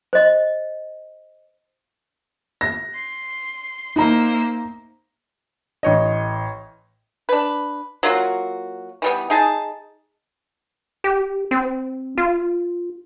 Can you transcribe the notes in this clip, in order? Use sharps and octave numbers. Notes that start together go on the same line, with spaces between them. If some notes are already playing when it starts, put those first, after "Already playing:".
C5 D#5
A#6
C6
A#3 D#4 C5 E5 A#5
A1 C#5 D#5
D4 B4
F#3 A#3 F4 F#4
E3 G3 B3
D#4 G#4 A5
G4
C4
F4